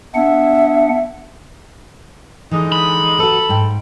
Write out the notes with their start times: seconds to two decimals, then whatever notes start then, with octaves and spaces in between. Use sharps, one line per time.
0.14 B3 D4 E5 F#5
2.51 D3 E3 G#3 D#4
2.72 B5
3.19 F#4 A4 B4
3.49 G#2 G5